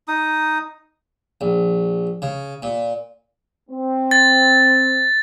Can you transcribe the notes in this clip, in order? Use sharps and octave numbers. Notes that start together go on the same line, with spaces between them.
D#4 D#6
A#1
C#3
A#2
C4
A6